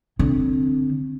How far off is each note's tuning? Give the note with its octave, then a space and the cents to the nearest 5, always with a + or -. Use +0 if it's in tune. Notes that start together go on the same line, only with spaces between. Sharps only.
D3 +0 C4 +0